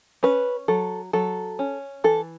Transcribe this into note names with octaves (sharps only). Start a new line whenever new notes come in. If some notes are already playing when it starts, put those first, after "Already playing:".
C#4 B4
F#3 A4
F#3 A4
C#4
E3 A4